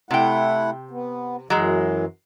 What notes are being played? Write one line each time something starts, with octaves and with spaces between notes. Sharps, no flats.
C3 A3 E4 F#5 G5
B3
F#2 E3 F#3 G#3